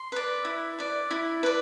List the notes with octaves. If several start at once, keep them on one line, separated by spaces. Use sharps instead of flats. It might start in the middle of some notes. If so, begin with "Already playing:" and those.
Already playing: C6
B4 D5
E4
B4 D5
E4
B4 D5